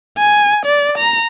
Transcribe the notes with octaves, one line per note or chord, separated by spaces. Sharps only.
G#5
D5
A#5